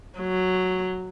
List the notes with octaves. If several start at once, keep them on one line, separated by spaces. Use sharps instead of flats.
F#3